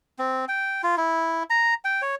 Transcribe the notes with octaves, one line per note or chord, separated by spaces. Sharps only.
C4
G5
F4
E4
A#5
G5
C#5